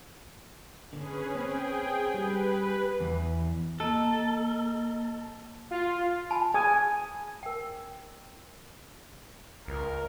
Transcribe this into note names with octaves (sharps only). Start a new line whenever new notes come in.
D3 C#4 G#4 B4
C4 C#4 G#4 G5
G3 B4
E2
A#3 A4 D#5
F4
G#5 A5 B5
G#4 G#5 D#6
A#4 G5
C#2 A#4